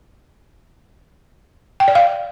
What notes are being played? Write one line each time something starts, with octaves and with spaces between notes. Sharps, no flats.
G5
D5
F5